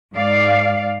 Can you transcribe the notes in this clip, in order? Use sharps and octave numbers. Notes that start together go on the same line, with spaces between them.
G#2 D5 F5